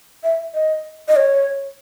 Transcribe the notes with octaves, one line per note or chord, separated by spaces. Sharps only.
E5
D#5
D#5
C#5